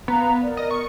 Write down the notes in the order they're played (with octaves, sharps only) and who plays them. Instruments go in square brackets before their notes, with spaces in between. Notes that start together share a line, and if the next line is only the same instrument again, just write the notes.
[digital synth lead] B3 [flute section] F5 A#5
[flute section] A#4 D5
[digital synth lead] D#5
C#6